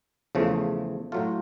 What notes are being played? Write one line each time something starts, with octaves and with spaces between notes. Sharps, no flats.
E2 C#3 F3 A3
A2 F#3 A3 F4